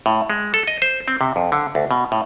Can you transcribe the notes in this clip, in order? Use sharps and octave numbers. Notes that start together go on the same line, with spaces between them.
A2
G#3
A4
D#5
C5
C4
C3
F2
D3
D2
B2
A2